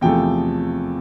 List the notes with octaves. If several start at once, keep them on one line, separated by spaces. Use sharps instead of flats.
E2 C3 F3 A3 G5